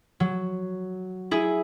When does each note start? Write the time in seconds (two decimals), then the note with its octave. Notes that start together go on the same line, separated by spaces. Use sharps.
0.20 F#3
1.31 E4 G#4